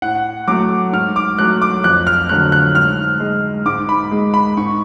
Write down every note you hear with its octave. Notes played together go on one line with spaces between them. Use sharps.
A2 F#5
F#3 A3 D6
G#2 F6
D6
F#3 A3 F#6
D6
F2 F#6
F6
D3 F#3 A3 F#6
F#6
G#2 F6
G#3
G#2 D6
B5
G#3
B5
G#2 C#6